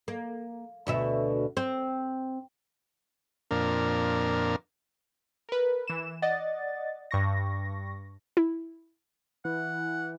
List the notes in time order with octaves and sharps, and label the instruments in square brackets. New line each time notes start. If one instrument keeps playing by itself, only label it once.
[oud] A#3
D2 B2 E5
C4
[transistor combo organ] F2 A#2 D4 A#4
[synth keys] A#4 B4
E3 E7
D5 D#5 F#5 A6
G2 C#6 A#6
[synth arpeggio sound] E4
[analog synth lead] E3 [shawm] F#5